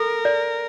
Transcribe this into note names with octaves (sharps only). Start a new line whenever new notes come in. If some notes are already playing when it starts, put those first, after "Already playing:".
Already playing: A4 A#4
D5